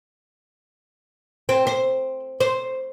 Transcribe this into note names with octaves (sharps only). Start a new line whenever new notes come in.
C4
C5
C5